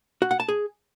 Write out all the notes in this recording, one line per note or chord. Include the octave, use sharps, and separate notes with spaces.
F#4
F#5
A5
G#4